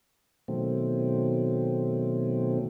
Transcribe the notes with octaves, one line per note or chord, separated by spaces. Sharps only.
B2 D#3 F#3 A3 C4